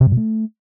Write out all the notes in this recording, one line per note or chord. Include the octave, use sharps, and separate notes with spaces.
C3
G2
B2
A3